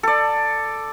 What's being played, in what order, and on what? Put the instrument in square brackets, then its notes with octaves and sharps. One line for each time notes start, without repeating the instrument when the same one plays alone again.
[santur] A4 D5